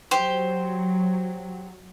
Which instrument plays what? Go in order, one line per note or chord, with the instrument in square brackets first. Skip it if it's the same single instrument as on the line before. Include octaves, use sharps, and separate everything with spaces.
[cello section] F#3 [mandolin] G4 C5